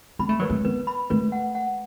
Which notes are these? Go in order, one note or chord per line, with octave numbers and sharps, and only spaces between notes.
B3 B5
A3
F#3 B4
A3
B3 B4
B5
A3 B4
F#5
F#5